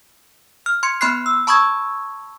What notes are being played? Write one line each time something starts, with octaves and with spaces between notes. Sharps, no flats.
F6
C6 G#6 C#7
B3 B5 C6 F6 F#6 C7
E6
A5 B5 C#6 D#6 E6 G#6